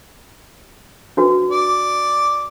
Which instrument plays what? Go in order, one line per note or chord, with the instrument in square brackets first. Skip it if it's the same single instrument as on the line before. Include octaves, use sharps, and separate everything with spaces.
[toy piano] D4 F#4 B4
[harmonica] D5